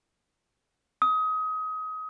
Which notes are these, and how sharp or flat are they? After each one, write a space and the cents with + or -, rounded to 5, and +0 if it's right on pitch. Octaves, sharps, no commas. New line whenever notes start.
D#6 +25